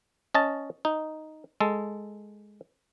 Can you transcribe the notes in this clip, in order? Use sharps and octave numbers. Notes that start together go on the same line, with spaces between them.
C#4 D#5 A5
D#4
G#3 A4